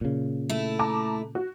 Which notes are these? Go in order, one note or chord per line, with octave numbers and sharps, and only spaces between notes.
A#2 C#3
A3 E4
A5 A#5 D6
F#4